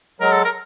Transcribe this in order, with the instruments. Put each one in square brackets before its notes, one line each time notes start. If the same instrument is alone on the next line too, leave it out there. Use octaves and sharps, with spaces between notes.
[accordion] F#3 G#3 [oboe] A#4
[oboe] A4
A#4